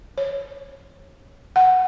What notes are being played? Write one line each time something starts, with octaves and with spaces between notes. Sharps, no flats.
C#5
F#5